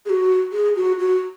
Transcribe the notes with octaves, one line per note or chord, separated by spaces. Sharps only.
G#4
F#4
G#4
F#4
F#4